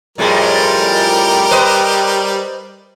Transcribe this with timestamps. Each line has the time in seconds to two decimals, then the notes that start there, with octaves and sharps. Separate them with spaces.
0.18 F2 A2 G3 G#3 G4 A#4
1.51 B4 C5 D#5